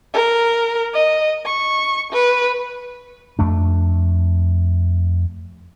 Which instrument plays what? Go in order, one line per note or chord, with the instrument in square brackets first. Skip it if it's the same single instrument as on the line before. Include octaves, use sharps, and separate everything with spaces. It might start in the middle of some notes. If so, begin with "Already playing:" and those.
[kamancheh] A#4
D#5
C#6
B4
[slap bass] F2 A3 D4